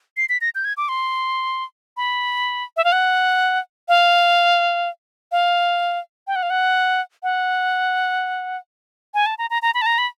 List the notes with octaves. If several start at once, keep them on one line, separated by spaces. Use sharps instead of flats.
C7
B6
A#6
G6
G#6
D6
C6
B5
E5
F5
F#5
F5
F5
G5
F#5
F5
F#5
F#5
G#5
A5
A#5
A#5
A#5
B5
A5
A#5
B5